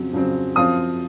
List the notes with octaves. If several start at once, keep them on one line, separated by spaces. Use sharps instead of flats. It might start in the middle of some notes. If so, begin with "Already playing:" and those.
Already playing: F2 C#3 F#3 C4
F2 C#3 F#3 C4
F#2 F3 C4 F4 D#6